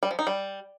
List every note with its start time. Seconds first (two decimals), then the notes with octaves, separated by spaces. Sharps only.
0.03 G3
0.11 F3
0.19 D#4
0.27 G3